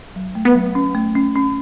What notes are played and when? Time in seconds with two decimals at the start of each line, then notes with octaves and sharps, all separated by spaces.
0.16 F#3
0.35 A3
0.45 B3
0.55 F#3
0.75 C#4
0.95 A3
1.15 C#4
1.35 C#4